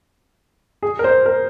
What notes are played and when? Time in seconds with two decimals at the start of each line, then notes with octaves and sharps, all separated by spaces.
0.83 G#4
0.99 A#4
1.04 C5
1.26 A#4